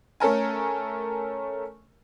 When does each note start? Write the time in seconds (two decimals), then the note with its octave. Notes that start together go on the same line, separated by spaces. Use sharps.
0.20 A3 C#4 A4 A#4 G#5